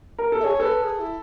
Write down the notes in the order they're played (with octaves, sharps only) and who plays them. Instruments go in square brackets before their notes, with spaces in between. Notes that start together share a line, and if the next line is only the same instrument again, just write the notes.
[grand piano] A#4
A4
[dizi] E5
[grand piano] G#4 [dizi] C#5
[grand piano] A4 [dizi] B4
[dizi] G#4
E4